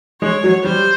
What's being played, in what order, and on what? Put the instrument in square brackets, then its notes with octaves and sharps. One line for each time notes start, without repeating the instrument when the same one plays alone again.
[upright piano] G#3 [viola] C#5
[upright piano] F#3
[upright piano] G3 [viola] C5